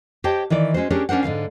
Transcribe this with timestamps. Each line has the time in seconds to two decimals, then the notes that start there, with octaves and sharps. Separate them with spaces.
0.24 G4 C5 C#5 D#5 G5 A5
0.50 D#3 E3 E4 D5
0.74 G#3 C#4 F#4 C5
0.90 C#4 D4 G4 G#4 A#4 C#5
1.09 C#4 D4 A#4 C5 F#5
1.23 G#2 D3 E3 F5